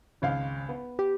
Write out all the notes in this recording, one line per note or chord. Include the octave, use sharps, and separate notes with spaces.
G#1 C#2 F5
B3
G4